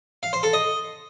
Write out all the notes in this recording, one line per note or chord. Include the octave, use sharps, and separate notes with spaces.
F5
C5
A4
D#5